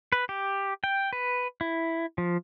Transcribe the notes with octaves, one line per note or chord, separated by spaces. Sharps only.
B4
G4
G5
B4
E4
F3